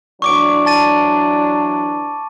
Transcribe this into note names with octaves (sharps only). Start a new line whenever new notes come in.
E3 F#3 D4 C#6 D6 D7
A5 A6 D#7